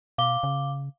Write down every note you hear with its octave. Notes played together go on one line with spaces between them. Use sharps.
B2 F5 D6 G7
C#3